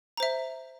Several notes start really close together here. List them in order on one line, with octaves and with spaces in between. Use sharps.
A#5 C5 E5